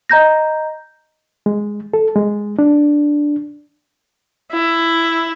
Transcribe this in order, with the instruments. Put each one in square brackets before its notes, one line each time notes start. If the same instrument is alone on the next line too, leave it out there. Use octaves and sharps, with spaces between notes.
[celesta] D#5 A#5 G6 A#6
[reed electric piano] G#3
A4
G#3
D4
[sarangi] E4